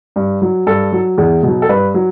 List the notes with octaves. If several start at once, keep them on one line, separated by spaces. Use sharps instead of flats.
G2
F#3
G2 A4
F#3
E2
B2 F#3
A4
G2 B4
F#3